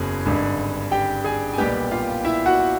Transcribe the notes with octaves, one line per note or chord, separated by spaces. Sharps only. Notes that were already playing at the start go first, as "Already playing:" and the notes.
Already playing: F#1 E2 C#3 F#3 G#4
G#1 G2 D3
G4 G5
G#4 G#5
G#5
B1 A#2 G3 B3 G4 G5
F4 F5
E4 E5
F#4 F#5